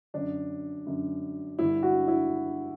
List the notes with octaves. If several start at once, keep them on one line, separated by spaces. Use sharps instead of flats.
F#2 D3 D4
F#2 D3
G2 D3 E4
F#4
E4